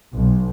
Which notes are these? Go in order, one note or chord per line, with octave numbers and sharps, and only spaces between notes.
B1